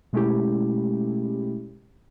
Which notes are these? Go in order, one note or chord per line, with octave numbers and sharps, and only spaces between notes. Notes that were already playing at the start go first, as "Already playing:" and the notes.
B2 G#3 A3 C#4 E4 G4